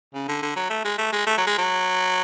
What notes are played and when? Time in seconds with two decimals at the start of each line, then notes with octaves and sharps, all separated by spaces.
0.14 C#3
0.28 D3
0.42 D3
0.56 F#3
0.70 A3
0.85 G#3
0.98 A3
1.13 G#3
1.27 A3
1.38 F#3
1.47 G#3
1.58 F#3